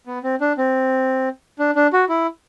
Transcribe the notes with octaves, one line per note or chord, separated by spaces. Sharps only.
B3
C4
D4
C4
D4
D4
F#4
E4